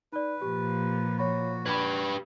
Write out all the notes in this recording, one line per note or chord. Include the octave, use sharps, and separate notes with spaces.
D#4 B4 D5
A#2 F3 G4
F#4 C#5 B5
G4 B4 B5 G#6